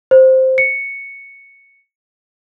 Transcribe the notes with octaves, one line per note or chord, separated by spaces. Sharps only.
C5
C#7